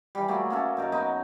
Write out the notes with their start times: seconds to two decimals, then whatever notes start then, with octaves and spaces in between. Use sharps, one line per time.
0.15 E3 G3
0.28 F#3 A3 A#3 G#4
0.50 A#3 C#4 A4
0.77 F#2 D#4 A#4
0.92 F#3 B3 D#4